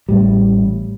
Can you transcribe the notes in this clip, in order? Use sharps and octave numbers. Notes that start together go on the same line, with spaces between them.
A1 A2 G3